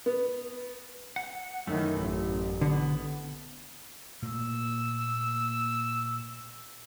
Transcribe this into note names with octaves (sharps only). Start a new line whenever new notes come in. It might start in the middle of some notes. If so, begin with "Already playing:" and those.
B3
F#5
F#2 D#3 E3 A3
A1
D3 B3
A#2 A3 A#3 E6